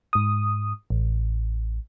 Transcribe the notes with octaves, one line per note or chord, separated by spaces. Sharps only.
G#2 D#6
A1